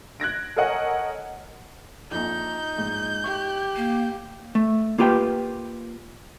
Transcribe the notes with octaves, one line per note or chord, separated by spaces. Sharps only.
F#6 G#6 A#6 D7
A4 A#4 C#5 D#5 F#5 G#5
A#1 F2 D#4 G6
A#1 G#2
G4 C#6
A#3
A3
A#3 F4 G4 B4 G5